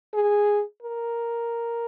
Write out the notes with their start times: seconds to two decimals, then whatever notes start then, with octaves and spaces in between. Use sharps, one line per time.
0.14 G#4
0.82 A#4